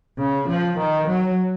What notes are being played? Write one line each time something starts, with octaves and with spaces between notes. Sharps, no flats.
C#3
F3
D#3
F#3